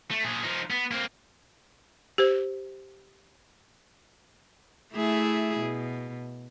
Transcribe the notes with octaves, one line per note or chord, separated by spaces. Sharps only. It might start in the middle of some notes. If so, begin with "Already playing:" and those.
A3
A#2 G#4
F3 D#4
B3
A#3 C4
G4 C5
A3 E4 G#4
B2